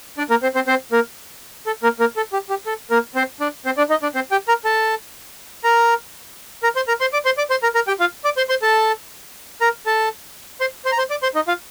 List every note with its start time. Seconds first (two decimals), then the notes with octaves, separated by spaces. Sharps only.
0.18 D4 D5
0.30 A#3 A#4
0.43 C4 C5
0.55 C4 C5
0.67 C4 C5
0.92 A#3 A#4
1.67 A4
1.83 A#3 A#4
2.00 A#3 A#4
2.17 A4
2.33 G4
2.50 G4
2.66 A4
2.91 A#3 A#4
3.15 C4 C5
3.40 D4 D5
3.65 C4 C5
3.77 D4 D5
3.90 D#4 D#5
4.03 D4 D5
4.15 C4 C5
4.31 G4 G5
4.48 A#4 A#5
4.65 A4 A5
5.64 A#4 A#5
6.63 A#4 A#5
6.76 C5 C6
6.88 A#4 A#5
7.01 C5 C6
7.13 D5 D6
7.25 C5 C6
7.38 D5 D6
7.50 C5 C6
7.63 A#4 A#5
7.75 A#4 A#5
7.87 G4 G5
8.00 F4 F5
8.24 D5 D6
8.37 C5 C6
8.49 C5 C6
8.62 A4 A5
9.61 A#4 A#5
9.86 A4 A5
10.61 C5 C6
10.85 C5 C6
10.92 A#5
10.98 C5 C6
11.10 D5 D6
11.23 C5 C6
11.35 D#4 D#5
11.48 F4 F5